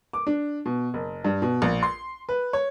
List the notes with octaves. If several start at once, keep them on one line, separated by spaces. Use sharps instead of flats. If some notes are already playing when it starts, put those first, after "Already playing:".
D6
D4
B2
F#1
G2
B2
A#1
C6
B4
C#5